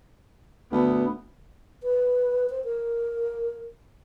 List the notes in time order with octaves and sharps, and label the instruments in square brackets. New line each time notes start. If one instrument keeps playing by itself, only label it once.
[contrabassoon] D2 [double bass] B3
[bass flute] B4
C5
A#4